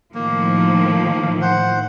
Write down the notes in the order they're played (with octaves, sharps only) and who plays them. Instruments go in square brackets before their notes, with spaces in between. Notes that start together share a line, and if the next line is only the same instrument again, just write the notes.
[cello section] A2 D#3 F3 [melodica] A#3
[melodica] C5 F#5